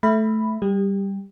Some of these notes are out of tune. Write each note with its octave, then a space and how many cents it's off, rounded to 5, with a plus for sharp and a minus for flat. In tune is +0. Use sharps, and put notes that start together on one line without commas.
A3 -10 E5 +0 B5 +0
G3 +0 G4 +20